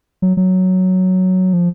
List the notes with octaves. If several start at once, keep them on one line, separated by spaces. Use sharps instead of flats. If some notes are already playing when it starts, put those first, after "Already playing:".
F#3
F#3
F3